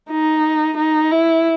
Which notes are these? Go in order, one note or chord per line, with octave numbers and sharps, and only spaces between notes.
D#4
D#4
E4